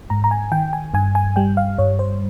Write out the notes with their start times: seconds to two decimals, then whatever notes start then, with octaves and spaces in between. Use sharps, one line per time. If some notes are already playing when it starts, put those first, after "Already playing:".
0.10 G#2 A#5
0.24 A#5
0.31 G#5
0.52 D#3 G5
0.73 G#5
0.94 G2 G#5
1.15 G#5
1.36 G3 G5
1.57 F5
1.78 G2 C#5
1.99 C5